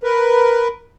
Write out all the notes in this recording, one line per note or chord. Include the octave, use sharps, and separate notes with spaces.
A#4 B4